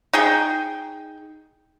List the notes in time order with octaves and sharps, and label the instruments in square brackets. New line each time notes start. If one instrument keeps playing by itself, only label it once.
[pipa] D#4 G#4 G5